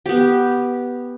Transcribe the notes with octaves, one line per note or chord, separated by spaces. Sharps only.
B3 G4